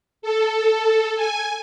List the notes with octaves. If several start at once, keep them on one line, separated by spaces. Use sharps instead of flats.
A4
G#5